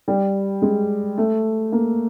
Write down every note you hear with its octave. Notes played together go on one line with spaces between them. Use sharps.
G3
G#3
A3
A#3